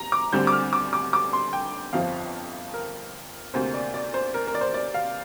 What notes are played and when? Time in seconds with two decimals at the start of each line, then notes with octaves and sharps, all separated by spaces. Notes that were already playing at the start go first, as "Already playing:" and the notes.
Already playing: A#5
0.12 D6
0.32 D2 D3 G3 C4 G6
0.47 D6
0.52 F6
0.73 D6
0.93 D6
1.13 D6
1.33 C6
1.53 G5
1.93 G1 F2 F3 C4 F5
2.74 A#4
3.54 D2 C3 A#3 C5
3.74 D5
3.94 D5
4.14 C5
4.34 A#4
4.47 A#4
4.55 D5
4.61 C5
4.74 D5
4.94 F5